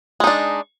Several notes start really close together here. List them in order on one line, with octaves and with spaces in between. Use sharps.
G#3 D#4 D4